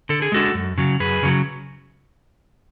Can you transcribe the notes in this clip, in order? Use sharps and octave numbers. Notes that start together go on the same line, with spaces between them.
D3 A4
G#4
G#3 D4 F#4 A4
F#2
C#3 F#3
F#2 G#4 B4
C#3 F#3